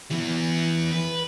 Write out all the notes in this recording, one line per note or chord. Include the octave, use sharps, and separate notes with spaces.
E3 B3
B4